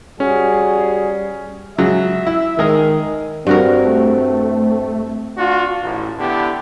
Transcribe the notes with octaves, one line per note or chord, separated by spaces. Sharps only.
G3 C#4 F#4 G#4
C#3 F#3 G#3 E5
E4
D#3 G#3 G#4 A#4
G2 C4 F#4 A#4
A3
D4 F4 F#4
A1
D3 B3 E4 G4